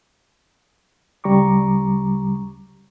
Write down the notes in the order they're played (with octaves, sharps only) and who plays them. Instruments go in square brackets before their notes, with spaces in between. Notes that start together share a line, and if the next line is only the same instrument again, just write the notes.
[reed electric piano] D2 C#3 G3 A#5 C#6 D6